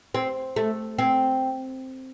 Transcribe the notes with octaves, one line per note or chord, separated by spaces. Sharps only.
C4
A3
C4